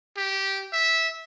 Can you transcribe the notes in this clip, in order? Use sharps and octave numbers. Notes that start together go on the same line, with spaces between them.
G4
E5